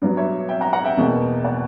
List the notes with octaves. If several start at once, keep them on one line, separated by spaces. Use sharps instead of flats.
G2 F#3 B3 D4 D5
C#5 E5
E5 G5
F#5 A#5
F#5 A#5
E5 G5
E2 B2 A#3
D5 F#5